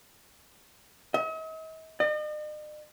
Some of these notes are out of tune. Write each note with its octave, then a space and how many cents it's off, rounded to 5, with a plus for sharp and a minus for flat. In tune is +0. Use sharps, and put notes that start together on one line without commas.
D#5 +45
D#5 -45